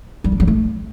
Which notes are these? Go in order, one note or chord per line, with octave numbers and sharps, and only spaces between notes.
G3
D4
G3
A3